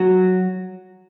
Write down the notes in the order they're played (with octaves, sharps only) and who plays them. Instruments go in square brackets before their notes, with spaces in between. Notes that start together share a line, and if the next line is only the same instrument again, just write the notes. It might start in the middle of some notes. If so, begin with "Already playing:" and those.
Already playing: [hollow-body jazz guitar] F#3 F#4